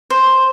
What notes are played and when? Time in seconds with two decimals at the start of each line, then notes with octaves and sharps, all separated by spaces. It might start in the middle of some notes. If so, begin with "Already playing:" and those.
0.10 C5